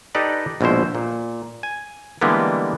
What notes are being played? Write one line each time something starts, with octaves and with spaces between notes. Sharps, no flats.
D#4 G4 A4 B4 D5 D#5
A#1 B2 G#3 E4 C5
A#2
G#5
D3 E3 G3 G#3 A#3 B3